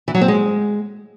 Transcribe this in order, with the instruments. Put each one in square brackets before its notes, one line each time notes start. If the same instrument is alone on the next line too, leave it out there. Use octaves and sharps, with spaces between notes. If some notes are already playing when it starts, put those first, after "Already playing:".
[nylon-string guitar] E3
F#3
C4
G#3